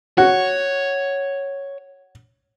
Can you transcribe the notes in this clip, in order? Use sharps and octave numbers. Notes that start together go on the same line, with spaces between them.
F#4 C#5